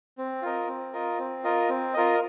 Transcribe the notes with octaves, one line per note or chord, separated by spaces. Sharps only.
C4
F4 A#4 D#5
C4
F4 A#4 D#5
C4
F4 A#4 D#5
C4
F4 A#4 D#5